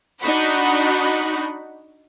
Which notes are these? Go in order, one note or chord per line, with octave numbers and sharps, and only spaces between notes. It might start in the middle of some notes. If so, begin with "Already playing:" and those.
D4 D#4 F#4 F#5 B5